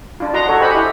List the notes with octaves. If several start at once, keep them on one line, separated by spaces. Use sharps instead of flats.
D4 F4
F#4 D#5 F#5 A#5 C6
F#4 A4 C#5
G4 C5 D#5 F#5 G#5 B5
E4 D#5